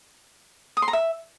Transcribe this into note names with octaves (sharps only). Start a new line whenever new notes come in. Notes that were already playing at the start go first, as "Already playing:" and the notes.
D#6
C6
A#5
E5